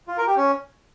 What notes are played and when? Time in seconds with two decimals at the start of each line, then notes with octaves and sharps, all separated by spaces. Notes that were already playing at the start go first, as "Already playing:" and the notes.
0.08 F4
0.17 A#4
0.27 G4
0.36 C#4